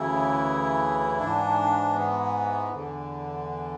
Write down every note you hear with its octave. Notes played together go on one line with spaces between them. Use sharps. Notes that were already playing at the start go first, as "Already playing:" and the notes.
Already playing: D2 C#3 E3 E4
G#2 E3 D4
B3
E2 D3